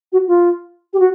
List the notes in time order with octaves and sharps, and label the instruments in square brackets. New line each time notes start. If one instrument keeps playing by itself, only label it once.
[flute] F#4
F4
G4
F#4